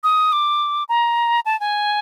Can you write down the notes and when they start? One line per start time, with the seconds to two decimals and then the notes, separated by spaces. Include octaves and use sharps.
0.04 D#6
0.32 D6
0.89 A#5
1.46 A5
1.60 G#5